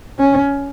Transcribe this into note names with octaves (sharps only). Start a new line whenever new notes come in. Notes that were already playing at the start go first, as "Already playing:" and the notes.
C#4